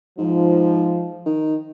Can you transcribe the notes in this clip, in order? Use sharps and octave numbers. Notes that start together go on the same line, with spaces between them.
G#2 F3
D#3